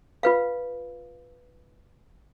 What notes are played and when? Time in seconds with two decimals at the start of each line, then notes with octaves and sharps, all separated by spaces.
0.23 F4 B4 F5